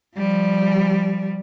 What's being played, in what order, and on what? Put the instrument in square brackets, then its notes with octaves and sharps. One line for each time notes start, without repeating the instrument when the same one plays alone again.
[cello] F3 G3